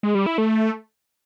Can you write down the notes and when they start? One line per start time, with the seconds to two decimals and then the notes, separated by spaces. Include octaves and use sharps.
0.03 G#3
0.15 G3
0.26 E4
0.38 A3